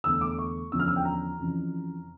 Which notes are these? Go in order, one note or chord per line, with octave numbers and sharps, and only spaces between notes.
E2 D3 A3 E6
D6
C#6
E2 D3 F3 C#4 E6
F6
E6
G5
A#5
F2 C#3 E3